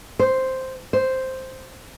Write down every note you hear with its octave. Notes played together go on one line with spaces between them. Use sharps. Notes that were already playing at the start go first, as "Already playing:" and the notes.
C5
C5